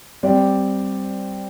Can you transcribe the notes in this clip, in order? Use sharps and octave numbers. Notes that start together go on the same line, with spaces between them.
G3 C4 G4 D5